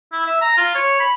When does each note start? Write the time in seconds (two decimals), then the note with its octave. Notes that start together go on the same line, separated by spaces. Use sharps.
0.12 E4
0.26 E5
0.41 A#5
0.57 F4
0.75 C#5
1.00 B5